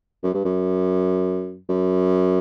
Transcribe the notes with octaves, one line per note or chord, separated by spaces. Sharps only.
F#2
G2
F#2
F#2